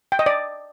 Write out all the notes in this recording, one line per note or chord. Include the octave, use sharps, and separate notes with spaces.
G5
D#5
D5